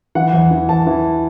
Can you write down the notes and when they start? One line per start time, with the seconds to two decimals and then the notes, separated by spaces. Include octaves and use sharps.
0.15 E3 F#5
0.33 E2
0.51 E3
0.69 E2 A5
0.87 E3